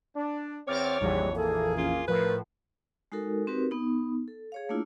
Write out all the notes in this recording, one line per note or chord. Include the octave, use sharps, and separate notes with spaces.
D4
E2 C4 C#5 D6 F6 A6
A#1 F2 G#2 E3 G3
A#3 G#4 A4
C#4 F4
A2 F3 A#4 B4
G#3 D#4 F#4 A4 A#4
C4 D#4 F#4 G4 A#4 B4
B3 D#4
A4
G#4 C#5 F5
A3 A#3 D4 E4 F4